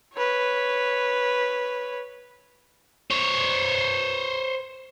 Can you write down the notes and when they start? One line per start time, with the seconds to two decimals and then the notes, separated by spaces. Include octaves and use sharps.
0.14 B4 C#5
3.10 C5 C#5